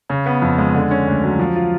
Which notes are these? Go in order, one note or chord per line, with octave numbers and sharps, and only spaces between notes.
C#3
B3
F2
G#3
D3
C#4
D2
F#3
F3
F4